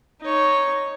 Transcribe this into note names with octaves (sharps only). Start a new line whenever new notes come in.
D#4 C#5